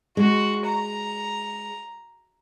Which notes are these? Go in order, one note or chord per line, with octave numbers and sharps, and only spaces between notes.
G#3 F#4
A#5